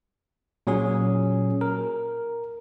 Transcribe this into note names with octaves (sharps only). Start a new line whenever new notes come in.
A#2 F#3 C#4 G#4
A#4